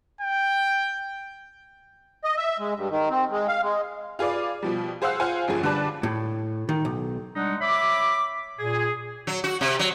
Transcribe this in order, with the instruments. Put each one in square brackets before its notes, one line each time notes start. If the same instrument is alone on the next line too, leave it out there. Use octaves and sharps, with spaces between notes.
[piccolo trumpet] G5
[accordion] D#5
E5
G#3
G2
D#3
C4
G#3
F5
G#3
[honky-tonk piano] F4 G#4 B4 D5 F5
B2 F3 G3
G#4 C5 F5 F#5 E6 F#6
F4 C5 F5 F#5 G#5
G1 F#2 F3 G#4
D3 G3 B4 D5 A5 F#6
[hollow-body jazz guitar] A2
D#3
B1
[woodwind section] G3 G#3 D4 D#4 F#5
C#5 E5 B5 D6
A#2 G#4
[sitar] F#3
F#4
C3
F#3